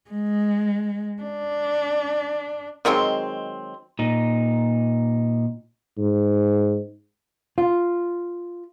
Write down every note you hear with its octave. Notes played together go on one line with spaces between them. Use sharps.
G#3
D4
D#3 F#3 G#3 C4
A#2 D#4
G#2
F4